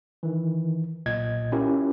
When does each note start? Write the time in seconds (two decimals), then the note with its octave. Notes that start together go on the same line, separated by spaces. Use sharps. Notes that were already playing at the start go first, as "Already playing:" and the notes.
0.23 D#3 E3
1.06 B1 A#2 D#5 G#6
1.52 C#4 E4 F4 G4 A#4